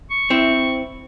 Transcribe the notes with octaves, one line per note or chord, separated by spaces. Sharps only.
C#6
C4 E4